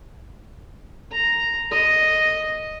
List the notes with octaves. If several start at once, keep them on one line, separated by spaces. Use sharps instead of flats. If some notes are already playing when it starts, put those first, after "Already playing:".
A#5
D#5